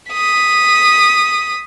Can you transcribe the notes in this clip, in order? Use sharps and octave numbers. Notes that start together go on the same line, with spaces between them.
D#6 B6